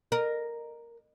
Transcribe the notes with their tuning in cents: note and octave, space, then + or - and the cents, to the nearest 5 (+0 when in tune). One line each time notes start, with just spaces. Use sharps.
A#4 +0 D#5 -35